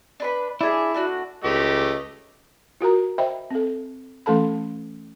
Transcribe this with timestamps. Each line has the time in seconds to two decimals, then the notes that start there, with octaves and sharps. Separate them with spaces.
0.20 D4 B4 B5
0.61 D4 E4 G#4 E5
0.94 A3 D4 F#4
1.44 C#2 A3 G4 D#5
2.81 F4 F#4 A#4 A#5
3.18 C5 D#5 E5 G5 B5
3.50 C4 A4
4.26 E3 A3 C#4 A4 A5 B5